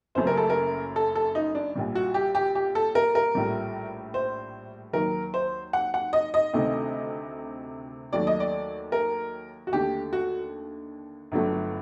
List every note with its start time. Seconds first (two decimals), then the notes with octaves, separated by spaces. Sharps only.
0.15 F#1 F#2 F#3 A3 C5
0.27 A#4
0.37 A4
0.50 A#4
0.96 A4
1.15 A4
1.35 D#4
1.55 D4
1.75 A#1 A#2 G3
1.95 F#4
2.14 G4
2.35 G4
2.55 G4
2.75 A4
2.95 A#4
3.15 A#4
3.35 A#1 A2 G3
4.14 C5
4.93 D#2 D#3 F#3 A#4
5.34 C5
5.73 F#5
5.94 F#5
6.13 D#5
6.34 D#5
6.53 D2 C3 D#3 A3
8.13 D#2 D#3 F#3 A3 D5
8.27 D#5
8.40 D5
8.92 A#4
9.67 F#4
9.72 D#2 D3 A3 G4
10.13 F#4
11.32 G1 G2 D3 F#3 A3